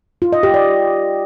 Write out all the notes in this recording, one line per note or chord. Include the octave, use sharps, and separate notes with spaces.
F4
D#5
G4
D5